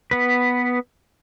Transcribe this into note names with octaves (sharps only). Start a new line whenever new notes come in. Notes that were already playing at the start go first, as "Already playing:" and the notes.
B3 B4